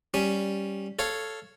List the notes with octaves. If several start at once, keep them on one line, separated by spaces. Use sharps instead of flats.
G3 C#4
A4 C#5 F5